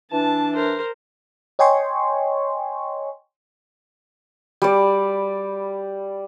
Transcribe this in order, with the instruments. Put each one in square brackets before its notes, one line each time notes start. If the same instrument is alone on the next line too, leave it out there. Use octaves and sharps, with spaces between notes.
[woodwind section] E3 D4 [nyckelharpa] A5
[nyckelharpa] A#4 C5
[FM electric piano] C#5 D#5 G5 G#5 C6 C#6
[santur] G3 D5